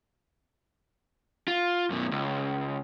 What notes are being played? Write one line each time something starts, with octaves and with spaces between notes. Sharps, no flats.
F4
F#2 B2
C#2